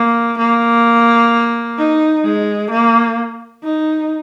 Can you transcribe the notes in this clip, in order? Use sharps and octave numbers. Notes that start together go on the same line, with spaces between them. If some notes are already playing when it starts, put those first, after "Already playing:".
Already playing: A#3
A#3
D#4
G#3
A#3
D#4